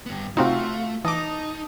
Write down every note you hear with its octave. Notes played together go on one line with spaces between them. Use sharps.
G2 B3
C3 A3 C4 D#4 F4 F#4 F5
E3 D#4 A5 D6 D#6